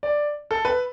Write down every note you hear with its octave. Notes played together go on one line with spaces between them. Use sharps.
D5
A4
B4